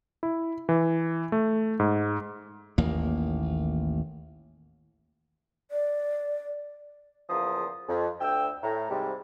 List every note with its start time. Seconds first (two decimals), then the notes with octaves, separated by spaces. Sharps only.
0.23 E4
0.69 E3
1.32 A3
1.80 G#2
2.78 A1 D#2 A#3
5.71 D5
7.29 E2 C#3 F3 A#3 D#6
7.88 F2
8.21 D2 G5 E6
8.63 A2 A#5
8.90 G#2 C3 G3